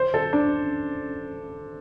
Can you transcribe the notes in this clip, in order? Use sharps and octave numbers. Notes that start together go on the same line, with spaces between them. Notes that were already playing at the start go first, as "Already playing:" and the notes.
Already playing: C5
A4
D4